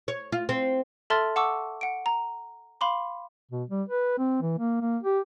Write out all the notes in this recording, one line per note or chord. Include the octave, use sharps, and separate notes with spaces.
C#5
F4
C4
A4 E5 A5 C6 F6 A6
F#5 A5 C#6 D6 E6
F#5 D7
A#5
F5 B5 C6 D6
B2
G3
B4
C4
E3
A#3
A#3
G4